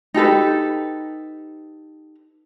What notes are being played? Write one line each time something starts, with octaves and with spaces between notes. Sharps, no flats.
D#4 G4 A4 B4